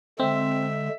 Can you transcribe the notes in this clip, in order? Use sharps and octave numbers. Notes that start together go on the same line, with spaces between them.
D3 G#3 C4 E5